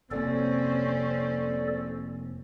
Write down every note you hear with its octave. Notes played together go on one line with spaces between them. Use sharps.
F1 C3 A#3 C4 C#4 A4 D5